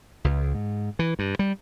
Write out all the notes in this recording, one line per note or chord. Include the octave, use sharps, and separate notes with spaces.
C#2
G#2
E3
G2
G3